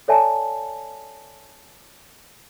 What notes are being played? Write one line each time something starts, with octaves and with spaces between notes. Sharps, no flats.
A4 C#5 D5 E5 G#5 A5